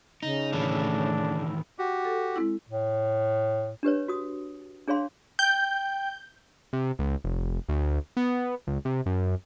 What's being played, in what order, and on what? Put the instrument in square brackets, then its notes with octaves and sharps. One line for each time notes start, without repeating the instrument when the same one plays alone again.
[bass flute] C#3 [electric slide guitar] D#4
[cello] A2 [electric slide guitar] D#3 E3 A3 [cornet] D4
[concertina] F#4 G4
[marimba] A4
G#3 C4 E4
[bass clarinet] A2
[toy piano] D4 G4 B4 C#5
F#4 D#6
D4 G#4 C#5 F5 C6
[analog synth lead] G5 [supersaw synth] G6
[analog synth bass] C3
C#2
F1
D2
B3
C#2
C3
F#2